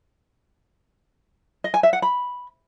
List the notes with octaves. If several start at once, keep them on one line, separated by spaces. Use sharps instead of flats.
D#5
G#5
E5
F#5
B5